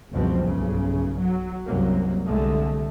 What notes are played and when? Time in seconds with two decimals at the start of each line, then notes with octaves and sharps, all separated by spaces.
0.12 F#1 C#2 B2 F3 G3 C4
0.44 B1 G2 C#3
1.19 F#3
1.66 C2 F#2 F#3 A#3
2.26 C2 D3 G#3 A3